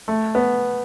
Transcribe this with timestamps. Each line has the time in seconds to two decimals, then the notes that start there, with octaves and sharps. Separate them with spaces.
0.08 A3
0.35 B3